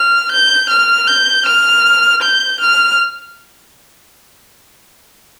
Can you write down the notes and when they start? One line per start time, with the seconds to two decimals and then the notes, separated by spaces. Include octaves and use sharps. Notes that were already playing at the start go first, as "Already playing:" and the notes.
Already playing: F6
0.31 G6
0.70 F6
1.07 G6
1.46 F6
2.23 G6
2.61 F6